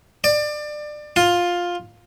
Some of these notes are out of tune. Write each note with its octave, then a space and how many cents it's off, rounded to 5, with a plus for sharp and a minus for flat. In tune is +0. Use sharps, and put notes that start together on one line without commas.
D5 +25
F4 +10